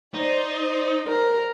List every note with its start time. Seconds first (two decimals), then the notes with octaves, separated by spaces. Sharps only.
0.14 D#4 C5 D5
1.08 A#4